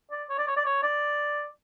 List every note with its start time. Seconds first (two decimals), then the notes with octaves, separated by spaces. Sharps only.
0.11 D5
0.29 C#5
0.38 D5
0.47 C#5
0.57 D5
0.66 C#5
0.83 D5